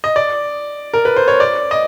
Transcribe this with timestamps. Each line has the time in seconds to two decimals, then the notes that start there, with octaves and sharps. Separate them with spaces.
0.04 D#5
0.16 D5
0.93 A#4
1.05 B4
1.16 C5
1.28 C#5
1.40 D5
1.71 D#5